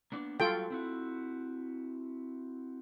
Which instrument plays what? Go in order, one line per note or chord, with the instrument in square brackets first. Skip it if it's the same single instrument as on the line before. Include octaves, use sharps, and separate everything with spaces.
[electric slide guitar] A#3 B3 D4
[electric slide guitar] F#3 G3 F#4 [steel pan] F4 A4 G5
[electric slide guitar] C4 E4 F#4